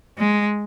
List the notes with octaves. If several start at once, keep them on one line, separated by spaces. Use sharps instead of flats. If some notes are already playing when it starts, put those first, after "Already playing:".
G#3